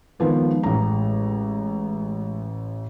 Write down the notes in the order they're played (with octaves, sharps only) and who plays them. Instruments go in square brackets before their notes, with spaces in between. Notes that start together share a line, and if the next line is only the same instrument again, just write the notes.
[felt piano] D#3 F3 B3 [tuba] G#3
[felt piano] A1 A#5